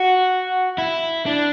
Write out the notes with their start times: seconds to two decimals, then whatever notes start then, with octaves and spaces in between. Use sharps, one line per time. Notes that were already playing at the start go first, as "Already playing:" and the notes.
Already playing: F#4
0.78 E4
1.26 D4